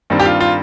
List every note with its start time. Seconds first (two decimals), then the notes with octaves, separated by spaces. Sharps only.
0.10 G2 D#3 G3 C4
0.20 G4
0.26 F4
0.41 F4